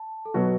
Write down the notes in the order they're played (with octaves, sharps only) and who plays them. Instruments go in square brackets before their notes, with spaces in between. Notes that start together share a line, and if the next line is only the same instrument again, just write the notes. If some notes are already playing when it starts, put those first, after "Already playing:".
Already playing: [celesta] A5
A4
[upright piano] B2 F#3 B3 F#4 [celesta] B4